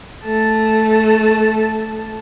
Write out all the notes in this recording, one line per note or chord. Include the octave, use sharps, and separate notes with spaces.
A3 A5